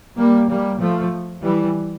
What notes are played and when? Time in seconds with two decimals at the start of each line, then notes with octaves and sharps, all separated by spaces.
0.16 G3 A#3
0.48 G3 A#3
0.79 F3 A3
1.42 E3 G3